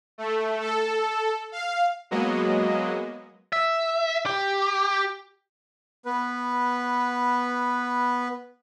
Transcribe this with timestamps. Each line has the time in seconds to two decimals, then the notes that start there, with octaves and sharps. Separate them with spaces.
0.18 A3
0.60 A4
1.52 F5
2.11 F#3 G#3 A#3 B3 F#4 D#5
3.53 E5
4.26 G4
6.06 B3 B4